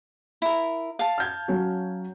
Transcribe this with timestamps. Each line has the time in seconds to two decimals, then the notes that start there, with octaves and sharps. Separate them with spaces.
0.42 E4 A#4
0.99 F5 A5
1.18 F6 G6 G#6
1.48 F#3 C#4 F#4